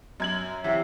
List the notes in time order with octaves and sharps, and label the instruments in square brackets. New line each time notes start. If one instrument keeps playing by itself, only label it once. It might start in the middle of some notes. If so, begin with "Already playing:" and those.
[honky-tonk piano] F#2 G#6 F#7
[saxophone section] C3 F#3 E5 [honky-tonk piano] E3